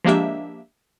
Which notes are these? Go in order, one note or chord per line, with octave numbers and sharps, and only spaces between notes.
F3 G#3 A#3 D4 G4 E5